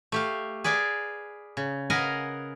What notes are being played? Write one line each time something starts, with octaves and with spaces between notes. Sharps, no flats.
A3 G4 F5
G#4 B4 D5 F5 G#5
C#3
A#4 B4 D#5 F5 F#5 G#5